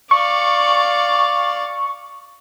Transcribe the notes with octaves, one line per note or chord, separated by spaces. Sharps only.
D5 F5 C#6